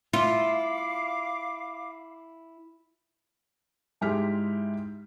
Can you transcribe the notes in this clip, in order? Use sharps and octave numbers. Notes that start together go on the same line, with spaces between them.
E4 F4 F5 D6
G#2 G#3 E4 G4 F6 B6